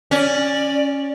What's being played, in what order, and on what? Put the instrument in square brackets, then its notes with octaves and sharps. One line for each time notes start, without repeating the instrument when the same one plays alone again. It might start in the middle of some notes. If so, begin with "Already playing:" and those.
[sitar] C#4 [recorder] D5